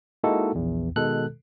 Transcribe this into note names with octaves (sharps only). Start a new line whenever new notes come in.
G#3 A#3 D#4 E4 F#4 A4
A#1 E2
B2 D#3 G#3 A4 F#6